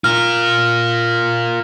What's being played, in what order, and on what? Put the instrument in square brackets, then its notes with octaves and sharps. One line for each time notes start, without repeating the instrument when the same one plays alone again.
[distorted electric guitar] F4 A#4 [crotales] F6